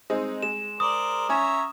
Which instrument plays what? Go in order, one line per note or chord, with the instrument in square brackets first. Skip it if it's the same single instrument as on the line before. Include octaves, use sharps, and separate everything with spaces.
[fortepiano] G#3 C4 D#4
[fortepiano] G#3 [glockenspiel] E7
[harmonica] A#4 C5 D5 [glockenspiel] D#6
[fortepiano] C#4 G#5 [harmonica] C#5 E5 A#5